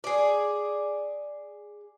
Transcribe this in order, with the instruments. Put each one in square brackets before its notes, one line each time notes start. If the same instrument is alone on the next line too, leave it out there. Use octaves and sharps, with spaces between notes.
[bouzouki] G#4 D5